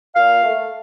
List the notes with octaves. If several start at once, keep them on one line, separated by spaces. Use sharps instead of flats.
A#2 F5
A3